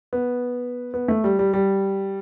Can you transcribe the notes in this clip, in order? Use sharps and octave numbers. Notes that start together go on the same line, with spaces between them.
B3
B3
A3
G3
G3
G3